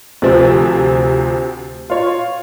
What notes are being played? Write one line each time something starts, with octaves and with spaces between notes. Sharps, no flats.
D2 C3 F3 C4
F4 C#5